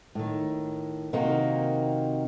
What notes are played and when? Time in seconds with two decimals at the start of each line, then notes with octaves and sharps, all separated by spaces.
0.15 A2 D#3
1.13 C3 D#3 A#3 C4 D#4 F#4